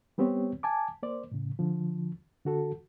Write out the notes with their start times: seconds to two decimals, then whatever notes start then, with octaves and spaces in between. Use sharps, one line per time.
0.18 G3 B3 C4 G4 C#5
0.63 G#5 A5 D6
1.03 A#3 C5 D5
1.32 A2 C#3
1.59 D3 F3
2.45 D3 F#4 A4